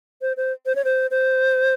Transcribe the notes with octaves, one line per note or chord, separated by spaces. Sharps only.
C5
C5
C5
C#5
C5
C5